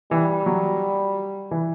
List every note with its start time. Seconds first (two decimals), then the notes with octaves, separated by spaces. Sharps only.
0.11 E3 G3
0.46 F#3
1.51 E3